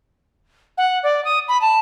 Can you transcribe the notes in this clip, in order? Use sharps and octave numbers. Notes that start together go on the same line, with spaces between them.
F#5
D5
D#6
B5
A5